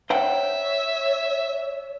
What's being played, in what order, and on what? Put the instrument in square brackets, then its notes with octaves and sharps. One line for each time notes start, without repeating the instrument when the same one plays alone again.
[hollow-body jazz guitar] C5 F#5 G5 [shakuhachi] C#5 [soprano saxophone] E5